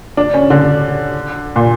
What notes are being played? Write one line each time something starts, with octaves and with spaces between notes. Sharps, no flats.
D4
C#4
D3
A#2